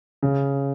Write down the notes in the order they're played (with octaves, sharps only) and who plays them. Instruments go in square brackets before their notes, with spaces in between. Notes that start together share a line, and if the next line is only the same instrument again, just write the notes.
[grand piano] C#3